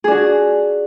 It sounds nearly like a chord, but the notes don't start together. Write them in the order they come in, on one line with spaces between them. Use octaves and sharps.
G#4 D4 F#4